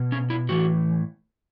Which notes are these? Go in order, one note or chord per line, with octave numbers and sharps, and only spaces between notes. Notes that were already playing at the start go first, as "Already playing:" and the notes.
Already playing: B2
C#4
E4
A2 E3 F#4